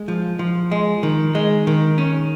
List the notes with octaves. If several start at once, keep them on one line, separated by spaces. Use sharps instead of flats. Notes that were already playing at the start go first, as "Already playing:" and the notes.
Already playing: G#3
F3
F3
G#3
D#3
G#3
D#3
C#4